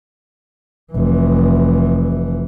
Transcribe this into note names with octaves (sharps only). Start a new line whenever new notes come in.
F1 E3